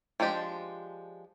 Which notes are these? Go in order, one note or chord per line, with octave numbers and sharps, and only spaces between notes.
F3 G#3 D4 G4 D5